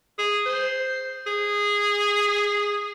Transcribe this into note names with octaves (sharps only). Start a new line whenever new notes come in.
G#4
C5
G#4